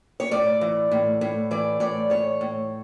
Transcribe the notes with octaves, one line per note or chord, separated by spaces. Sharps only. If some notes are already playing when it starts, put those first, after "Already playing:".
C#5
A2 D5
E3
A2
A2
E3 D5
A2 D5
E3 C#5
A2